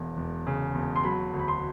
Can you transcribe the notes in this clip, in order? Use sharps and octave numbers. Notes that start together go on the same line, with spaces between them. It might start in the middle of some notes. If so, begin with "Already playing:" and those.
Already playing: E1 E2
E1
C#3
E1
C6
F#3 B5
D2
B5
C6